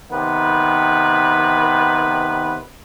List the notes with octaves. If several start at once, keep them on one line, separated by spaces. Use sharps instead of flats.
C3 D#3 B3 B4